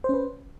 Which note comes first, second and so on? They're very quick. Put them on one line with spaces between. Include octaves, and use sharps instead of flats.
C5 C#4 B4